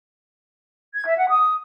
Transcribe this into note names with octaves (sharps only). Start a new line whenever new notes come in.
G#6
E5
F#5
D#6